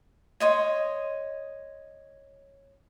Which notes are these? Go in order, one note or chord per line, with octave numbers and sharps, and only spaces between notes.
C#5 D#5 C6